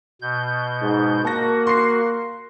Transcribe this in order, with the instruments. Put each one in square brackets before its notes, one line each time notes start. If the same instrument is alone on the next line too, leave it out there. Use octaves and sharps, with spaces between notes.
[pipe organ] B2 G6
[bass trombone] G#2
[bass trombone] A#3 [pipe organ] F#4 [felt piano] A5 A#6
[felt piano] C6 C7